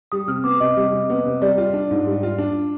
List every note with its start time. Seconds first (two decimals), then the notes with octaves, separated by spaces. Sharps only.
0.12 G3 D#6
0.28 C3 F6
0.44 B3 D6
0.60 C3 D#5
0.77 G3
0.93 C3
1.10 B3
1.26 C3
1.42 G3 D5
1.58 F4
1.74 D4
1.91 G#2
2.07 G3
2.23 F4
2.38 D4